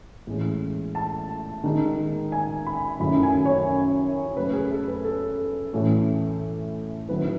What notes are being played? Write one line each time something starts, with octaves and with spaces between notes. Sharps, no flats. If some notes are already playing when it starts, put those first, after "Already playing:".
A2 E3 G#3 C#4
A5
D#3 G#3 D#4
G#5
B5
F#2 D#3 A3 C#4 E4 B5
G#5
C#5
C#3 F#3 A3 B4
G#4
A4
B4
A4
A2 E3 A3 C#4
D#3 F#3 A3 E4 B4